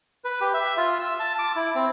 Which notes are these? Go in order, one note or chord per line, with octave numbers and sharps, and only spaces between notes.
B4
G4
E5
F4
E6
A5
D6
E4
C4